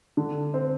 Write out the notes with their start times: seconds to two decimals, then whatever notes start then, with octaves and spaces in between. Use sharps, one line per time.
0.17 D3
0.54 C4